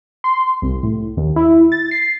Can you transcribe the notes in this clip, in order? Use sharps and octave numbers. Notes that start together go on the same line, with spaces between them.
C6
C2
A2
D#2
E4
A6
C7